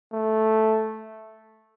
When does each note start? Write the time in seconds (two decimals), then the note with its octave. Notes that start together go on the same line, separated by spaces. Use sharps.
0.12 A3